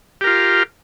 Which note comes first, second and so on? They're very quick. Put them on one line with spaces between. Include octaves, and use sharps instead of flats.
G4 A#4 F4